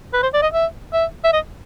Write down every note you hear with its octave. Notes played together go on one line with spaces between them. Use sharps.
B4
C5
D5
D#5
E5
E5
E5
D#5